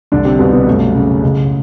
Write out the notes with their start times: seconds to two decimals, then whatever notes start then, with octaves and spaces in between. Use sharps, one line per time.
0.12 C2 D3 D4
0.25 C3 C4
0.39 C2 B2 B3
0.53 B2 B3
0.67 F#2 A3
0.95 C#3
1.23 C#2 G#3